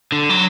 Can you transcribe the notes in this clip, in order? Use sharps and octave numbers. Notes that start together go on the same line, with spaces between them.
D3
F#3